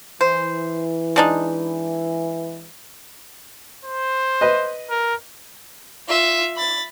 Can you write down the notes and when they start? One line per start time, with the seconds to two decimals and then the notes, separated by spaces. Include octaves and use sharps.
0.21 E3 C5
1.16 G#3 D4 D#4
3.85 C5
4.41 B4 D#5
4.90 A#4
6.08 F4 E5
6.56 B5 A6